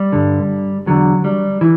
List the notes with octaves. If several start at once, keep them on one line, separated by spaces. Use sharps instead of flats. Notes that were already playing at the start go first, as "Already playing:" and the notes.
Already playing: G3
G2 D3
E2 D3 F#3
G3
E3